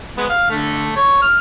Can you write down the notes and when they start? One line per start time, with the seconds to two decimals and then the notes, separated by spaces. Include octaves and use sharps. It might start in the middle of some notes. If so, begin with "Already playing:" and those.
0.17 G#3 B3
0.29 F5
0.50 D3 A3
0.96 C#5
1.22 F6